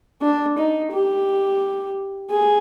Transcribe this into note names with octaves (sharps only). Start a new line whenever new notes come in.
D4
D#4
G4
G#4